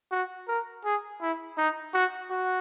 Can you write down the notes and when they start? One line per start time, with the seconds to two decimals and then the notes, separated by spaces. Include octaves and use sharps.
0.11 F#4
0.48 A#4
0.85 G#4
1.21 E4
1.58 D#4
1.94 F#4
2.31 F#4